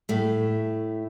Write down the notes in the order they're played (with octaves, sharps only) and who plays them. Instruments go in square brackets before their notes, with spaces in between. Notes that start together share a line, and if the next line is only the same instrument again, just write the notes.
[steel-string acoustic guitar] A2 A3